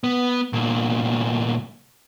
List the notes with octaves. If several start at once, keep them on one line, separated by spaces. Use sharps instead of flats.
B3
C2 A#2